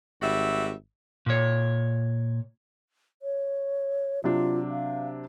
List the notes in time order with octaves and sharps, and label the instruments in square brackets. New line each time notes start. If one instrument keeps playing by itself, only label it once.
[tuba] G#1 [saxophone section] G3 F#4 E5
[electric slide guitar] A#2 C#5
[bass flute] C#5
[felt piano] C3 F#3 D4 [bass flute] F4
[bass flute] F5